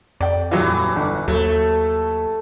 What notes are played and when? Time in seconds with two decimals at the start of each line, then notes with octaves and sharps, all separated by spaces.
0.21 F2 D5 G5
0.51 D#1 E3 F#3 F4
0.96 G1
1.28 D#2 F#3 A3